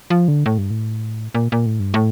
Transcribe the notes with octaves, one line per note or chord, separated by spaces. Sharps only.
F3
D3
A2
G2
A2
A#2
A#2
A2
G2
A2